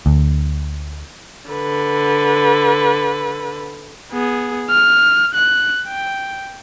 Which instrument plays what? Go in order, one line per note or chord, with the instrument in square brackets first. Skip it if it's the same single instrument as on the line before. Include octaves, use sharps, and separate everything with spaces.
[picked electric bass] D2
[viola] D3 B4
[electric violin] B3 G#4
F6
F#6
G5